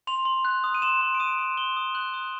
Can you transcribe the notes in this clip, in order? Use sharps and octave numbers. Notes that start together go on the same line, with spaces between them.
C6 F7
C6
F#6
D#6
D#7
C6 E7
C6
D7
D#6 D#7
C6
C6 G7
D#6
F#6 F#7
D#6